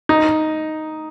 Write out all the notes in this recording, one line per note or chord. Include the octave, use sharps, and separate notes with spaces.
D#4